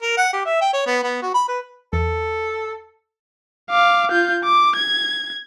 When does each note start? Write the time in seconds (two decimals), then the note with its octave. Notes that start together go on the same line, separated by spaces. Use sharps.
0.02 A#4
0.17 F#5
0.33 G4
0.46 E5
0.61 G5
0.73 C#5
0.87 B3
1.03 B3
1.22 F#4
1.34 B5
1.48 B4
1.93 E2 A4
3.70 F5 D6
4.11 F4 G6
4.44 D6
4.76 G#6